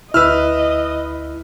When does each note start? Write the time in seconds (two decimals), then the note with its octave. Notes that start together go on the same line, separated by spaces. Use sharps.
0.14 D2 E4 B4 D#5 E6 F6